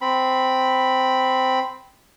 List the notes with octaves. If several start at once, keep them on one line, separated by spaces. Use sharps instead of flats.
C4 B5